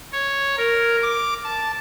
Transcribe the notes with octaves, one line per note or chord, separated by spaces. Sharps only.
C#5
A#4
D6
A5